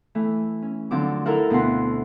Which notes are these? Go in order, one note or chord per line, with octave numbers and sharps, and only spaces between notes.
E3 A3
C#4
D#2 D3 F3 F#3 C4 D6
E4 F#4 A4 A#4 F5 F#5
D2 B2 F#4 B4 F#5 C6